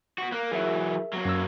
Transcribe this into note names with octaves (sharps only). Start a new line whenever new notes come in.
B3 F#4
A#3 F#6
E3 F#3 G#4 A#4 E5
F#3 A#3
F#2 E6